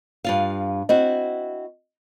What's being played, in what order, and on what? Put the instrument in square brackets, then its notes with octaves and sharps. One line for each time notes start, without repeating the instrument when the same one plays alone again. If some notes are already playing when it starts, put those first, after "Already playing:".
[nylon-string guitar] G2 F4 F5
[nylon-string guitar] C4 E4 F#4 [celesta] D#5